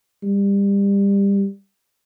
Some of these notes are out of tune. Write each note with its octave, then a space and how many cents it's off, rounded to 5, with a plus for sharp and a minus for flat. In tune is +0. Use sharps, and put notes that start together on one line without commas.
G3 +25